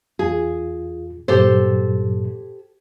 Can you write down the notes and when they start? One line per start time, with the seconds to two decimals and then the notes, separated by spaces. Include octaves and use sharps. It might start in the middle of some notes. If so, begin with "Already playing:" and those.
0.19 E2 F4 G#4
1.28 G2 A#2 F#3 G4 A4 C5